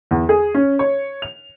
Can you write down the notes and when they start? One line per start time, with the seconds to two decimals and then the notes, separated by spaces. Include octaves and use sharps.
0.11 E2
0.29 G#4
0.54 C#4
0.79 C#5
1.22 F7